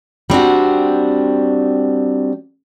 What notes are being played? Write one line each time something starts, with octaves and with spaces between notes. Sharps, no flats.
G3 C4 D4 F#4